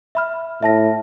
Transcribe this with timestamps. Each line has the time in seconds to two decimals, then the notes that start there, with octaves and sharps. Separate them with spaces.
0.15 E5 B5 F6
0.62 A2 E5 A5 A#6